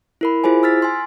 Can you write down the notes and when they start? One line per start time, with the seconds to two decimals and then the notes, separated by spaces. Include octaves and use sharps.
0.21 E4 A#4 B5
0.44 E4 F4 G#4 C5 G#5
0.63 E6 F6 A6 B6
0.82 G#5 C6